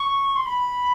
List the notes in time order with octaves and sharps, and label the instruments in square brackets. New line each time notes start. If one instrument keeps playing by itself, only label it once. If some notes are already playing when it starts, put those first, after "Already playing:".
Already playing: [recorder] C#6
C6
B5